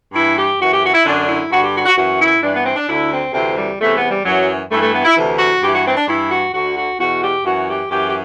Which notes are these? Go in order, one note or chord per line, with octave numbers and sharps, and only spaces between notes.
G2 E3 E4
G4
F#2 E3 F#4
G4
F#4
E4
F#2 D3 D4
E4
G2 D3 F#4
G4
F#4
F#4
F#2 E3 F#4
E4
G2 E3 D4
B3
C4
D4
D2 D3 E4
C4
D2 C3 E3 C4
G3
E2 C3 E3 A3
B3
G3
F#2 E3 F#3
G2 E3 A3
A3
B3
E4
D2 C3 E3
F#4
G2 E3 G4
F#4
C4
D4
G2 E3 E4
F#4
D2 D3 F#4
F#4
E2 B2 F#4
G4
F#2 E3 F#4
G4
F#2 E3 G4
G4